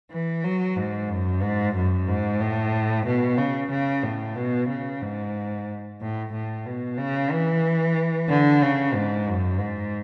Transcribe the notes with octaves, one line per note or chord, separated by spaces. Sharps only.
E3
F#3
G#2
F#2
G#2
F#2
G#2
A2
B2
C#3
C#3
A2
B2
C#3
G#2
A2
A2
B2
C#3
E3
D3
C#3
G#2
F#2
G#2